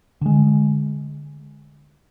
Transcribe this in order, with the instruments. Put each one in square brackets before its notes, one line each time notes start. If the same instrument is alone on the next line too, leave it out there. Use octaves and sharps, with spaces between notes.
[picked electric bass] D3 G#3